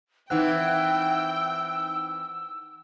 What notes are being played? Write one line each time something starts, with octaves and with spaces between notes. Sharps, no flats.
E3 C4 D#4 F#5 G5 E6 F#6